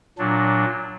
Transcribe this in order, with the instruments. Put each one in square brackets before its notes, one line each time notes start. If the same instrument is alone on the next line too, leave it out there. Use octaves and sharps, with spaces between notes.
[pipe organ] A#2 F#3 D4